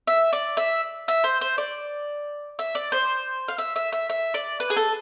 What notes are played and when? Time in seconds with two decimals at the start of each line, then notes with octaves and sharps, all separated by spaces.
0.07 E5
0.33 D5
0.57 E5
1.08 E5
1.24 C5
1.41 C5
1.58 D5
2.59 E5
2.75 D5
2.92 C5
3.48 F5
3.58 E5
3.76 E5
3.92 E5
4.10 E5
4.34 D5
4.60 B4
4.70 G#4
4.76 A4